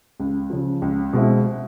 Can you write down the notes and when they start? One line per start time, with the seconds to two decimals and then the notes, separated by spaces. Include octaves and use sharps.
0.20 C#2
0.50 C#3 F3
0.82 C#2
1.13 B2 G#3 C4 E4